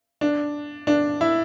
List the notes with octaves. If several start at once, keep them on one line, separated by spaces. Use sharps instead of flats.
D4
D4
E4